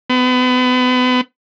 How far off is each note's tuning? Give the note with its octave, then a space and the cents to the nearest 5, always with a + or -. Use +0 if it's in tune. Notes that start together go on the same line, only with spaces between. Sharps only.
B3 +35